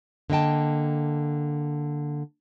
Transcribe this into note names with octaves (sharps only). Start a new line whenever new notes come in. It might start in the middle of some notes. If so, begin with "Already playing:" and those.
D3 A#3 D#5 G5 A5